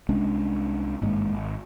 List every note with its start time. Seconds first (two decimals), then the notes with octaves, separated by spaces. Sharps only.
0.09 C2 G#3 C#4 D4
1.02 G#1 G2 G#3 A#3
1.34 G#1